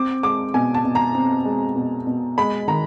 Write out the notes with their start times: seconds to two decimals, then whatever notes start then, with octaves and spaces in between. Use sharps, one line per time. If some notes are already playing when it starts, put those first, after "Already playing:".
Already playing: C4 D6
0.23 G#3 D6
0.54 B2 G#5
0.75 A5
0.85 B2
0.95 A#5
1.15 C4
1.45 G#3
1.76 B2
2.07 B2
2.38 G#3 B5
2.68 D#3 A#5